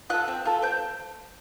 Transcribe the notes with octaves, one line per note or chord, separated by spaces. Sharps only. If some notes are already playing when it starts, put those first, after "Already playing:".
F4 A4 F#6
C4
F4 A4
C4 G6